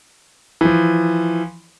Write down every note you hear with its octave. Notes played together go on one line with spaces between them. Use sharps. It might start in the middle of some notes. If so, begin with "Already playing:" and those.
E3 F3